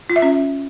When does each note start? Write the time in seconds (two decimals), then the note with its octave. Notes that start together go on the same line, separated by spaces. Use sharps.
0.10 F4
0.16 E5
0.22 C#4